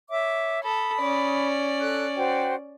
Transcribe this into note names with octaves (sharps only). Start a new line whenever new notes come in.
C#5 E5 D6
A4 B5 D#6
C#4 D5
A4 F#6
F#4 C5 G5